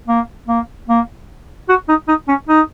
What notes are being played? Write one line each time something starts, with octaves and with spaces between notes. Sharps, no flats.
A#3
A#3
A#3
F#4
D#4
D#4
C#4
D#4